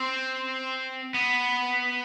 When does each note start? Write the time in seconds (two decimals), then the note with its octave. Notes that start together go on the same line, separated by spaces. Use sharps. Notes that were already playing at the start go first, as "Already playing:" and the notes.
Already playing: C4
1.14 B3